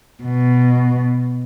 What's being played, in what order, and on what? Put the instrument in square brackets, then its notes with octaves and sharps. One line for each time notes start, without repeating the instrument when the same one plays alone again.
[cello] B2